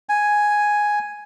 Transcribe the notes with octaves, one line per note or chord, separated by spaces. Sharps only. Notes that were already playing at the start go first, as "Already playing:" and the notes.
G#5